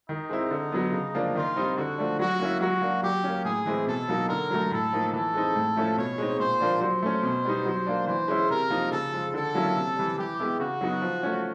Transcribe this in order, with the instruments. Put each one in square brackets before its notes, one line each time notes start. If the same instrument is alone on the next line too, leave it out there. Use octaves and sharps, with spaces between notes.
[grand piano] D#3 [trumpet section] D#4
[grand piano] G#3 C4 E4
D3
F#3 B3
C#3
F3 A#3 D4
[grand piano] D#3 [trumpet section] F4
[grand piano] G3 C4 D#4
[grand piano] D3 [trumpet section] F#4
[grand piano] F3 A3 D4
[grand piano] F#3 [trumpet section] F#4
[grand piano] A#3 C#4 E4
[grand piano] F#3 [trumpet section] F#4
[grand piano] A#3 D4
[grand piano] F#3 [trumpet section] G4
[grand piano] A#3 C#4
[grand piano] A2 [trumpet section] G#4
[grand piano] E3 G#3 C4 E4
[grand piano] B2 [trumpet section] A4
[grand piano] F#3 A#3 D#4
[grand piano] D3 [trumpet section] A#4
[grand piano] F#3 A3
[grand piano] A2 [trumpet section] A4
[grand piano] F3 A#3 D#4
[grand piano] E3 [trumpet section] A4
[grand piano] G#3 C4 D#4
A2
F3 A3 C#4 E4
[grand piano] B2 [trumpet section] C#5
[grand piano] G#3 C4 D#4
[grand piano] A#2 [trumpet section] C5
[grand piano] F3 A#3 D4
[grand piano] F#3 [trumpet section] C5
[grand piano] A3 C#4
B2
G3 B3 D#4
F#3
A#3 D4
[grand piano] E3 [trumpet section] C5
[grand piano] G#3 C#4 E4
[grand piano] C3 [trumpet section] A#4
[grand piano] F3 A#3 D#4
[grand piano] C#3 [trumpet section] A4
[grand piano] F3 G#3
[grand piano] D3 [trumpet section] A4
[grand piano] F#3 A#3 C#4 E4
C3
E3 G3
[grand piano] E3 [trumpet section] G4
[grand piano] G#3 B3 E4
[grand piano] C#3 [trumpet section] F#4
[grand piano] F#3 B3 D#4
F3
A3 C#4